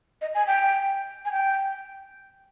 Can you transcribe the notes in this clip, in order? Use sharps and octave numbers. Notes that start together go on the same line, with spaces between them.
D#5
G#5
G5
G#5
G5